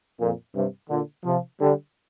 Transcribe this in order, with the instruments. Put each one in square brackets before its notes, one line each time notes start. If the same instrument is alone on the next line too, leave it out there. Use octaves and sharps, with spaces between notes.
[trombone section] F2 A#2
G2 C3
A#2 D3
C3 F3
D3 G3